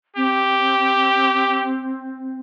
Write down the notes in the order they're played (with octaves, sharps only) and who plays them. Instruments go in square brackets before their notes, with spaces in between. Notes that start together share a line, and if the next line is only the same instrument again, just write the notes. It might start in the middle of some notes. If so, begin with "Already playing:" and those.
[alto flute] C4 [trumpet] G4